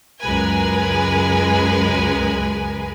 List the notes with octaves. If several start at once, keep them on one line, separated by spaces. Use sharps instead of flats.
C#2 F#2 G#3 A#4 B4 G#5